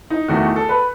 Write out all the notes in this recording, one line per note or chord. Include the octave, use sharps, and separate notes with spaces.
D#4
E2 D#3 A3 F#4
G#4
A4
B4